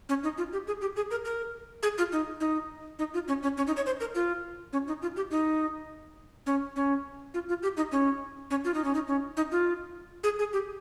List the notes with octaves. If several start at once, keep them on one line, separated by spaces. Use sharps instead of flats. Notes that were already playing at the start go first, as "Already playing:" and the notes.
C#4
D#4
F4
G4
G#4
G4
G#4
A#4
A#4
G#4
F4
D#4
D#4
D#4
F4
C#4
C#4
C#4
D#4
C#5
C5
A#4
F4
C#4
D#4
F4
G4
D#4
C#4
C#4
F4
F4
G4
D#4
C#4
C#4
F4
D#4
C#4
D#4
C#4
D#4
F4
G#4
G#4
G4